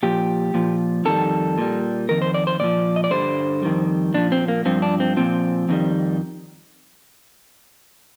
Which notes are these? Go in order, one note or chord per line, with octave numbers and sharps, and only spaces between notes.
A#2 F3 G4
A#2 F3
F2 D#3 G3 A4
A#2 G3
F2 D#3 A#4
C5
D5
C5
A#2 F3 D5
D#5
D5
G2 D3 G3 C5
F2 D#3 G3
A#2 F3 D4
C4
A#3
G2 F3 C4
D4
C4
A#2 F3 C4
F2 D#3 G3